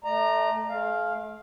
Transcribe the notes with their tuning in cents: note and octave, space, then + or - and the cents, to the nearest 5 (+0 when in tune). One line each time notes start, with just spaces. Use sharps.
A3 -10 D5 +45 A#5 +0
A3 -45 F5 +0